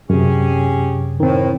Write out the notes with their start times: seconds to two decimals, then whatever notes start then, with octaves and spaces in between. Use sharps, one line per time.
0.10 F#2 C3 C#4 G4 G#4
1.20 A2 D#3 C4